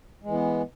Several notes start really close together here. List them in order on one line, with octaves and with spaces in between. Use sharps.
G#3 E3 B3